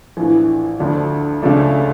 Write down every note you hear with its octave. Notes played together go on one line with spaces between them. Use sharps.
A#1 A2 E3
D2 D3 F3 A3
C#2 C#3 F3 A3 D4